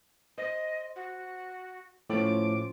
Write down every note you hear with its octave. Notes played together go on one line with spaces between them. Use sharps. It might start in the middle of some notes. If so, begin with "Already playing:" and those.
C5 D#5
F#4
A2 F3 C#4 C5 D6